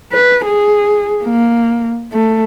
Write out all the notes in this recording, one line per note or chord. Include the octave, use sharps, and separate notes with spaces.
B4
G#4
A#3
A3